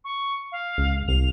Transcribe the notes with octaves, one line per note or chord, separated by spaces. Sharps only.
C#6
F5
C#2
C2 F7